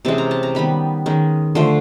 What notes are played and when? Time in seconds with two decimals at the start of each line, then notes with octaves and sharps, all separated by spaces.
0.05 C3 E3 G#3 C#4 A5
0.18 A#5
0.31 A5
0.43 A#5
0.55 D#3 G3 B3 B5
1.06 D#3 G#3 C#4
1.55 D3 F3 A3 C6